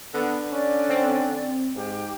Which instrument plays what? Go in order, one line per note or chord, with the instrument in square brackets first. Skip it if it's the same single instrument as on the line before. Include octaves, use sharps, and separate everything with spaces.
[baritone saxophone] D3 [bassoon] B3
[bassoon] C#4 [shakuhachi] D5
[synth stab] C4
[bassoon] G#2 [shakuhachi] G4